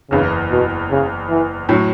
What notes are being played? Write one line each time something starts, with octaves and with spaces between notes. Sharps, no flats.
F#1 E2 C#3 E3
B2
C#3
E3
A2 F#3